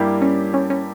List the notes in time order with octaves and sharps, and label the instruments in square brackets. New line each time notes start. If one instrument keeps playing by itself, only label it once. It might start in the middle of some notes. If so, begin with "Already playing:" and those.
Already playing: [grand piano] G2 G3 A#3 E4 G4
[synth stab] C#4
C#4
C#4